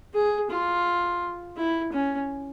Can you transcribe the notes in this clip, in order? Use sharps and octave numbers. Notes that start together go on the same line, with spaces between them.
G#4
F4
E4
C#4